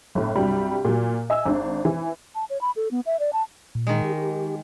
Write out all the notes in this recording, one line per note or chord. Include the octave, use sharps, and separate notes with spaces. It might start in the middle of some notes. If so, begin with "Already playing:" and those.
G1 A2
C2 G2 F#3 G3
A#2 F#3
D#5 E5 G#5 E6
G#1 D4
E3
A5
C#5
B5
A4
B3
E5
D5
A5
A#2
D#3 G#3
G4
G4